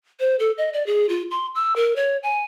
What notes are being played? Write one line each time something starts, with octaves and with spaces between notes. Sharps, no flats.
C5
A4
D#5
D5
G#4
F4
C6
E6
A#4
C#5
G#5